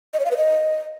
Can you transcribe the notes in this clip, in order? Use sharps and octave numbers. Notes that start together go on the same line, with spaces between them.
D#5
C#5
F5
B4
D#5